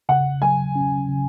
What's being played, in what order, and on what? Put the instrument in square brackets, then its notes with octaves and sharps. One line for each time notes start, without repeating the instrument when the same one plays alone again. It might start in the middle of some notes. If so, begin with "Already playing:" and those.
[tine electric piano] C#3 [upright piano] F#5
[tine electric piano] F#3 [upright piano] G#5
[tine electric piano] C#4
C#3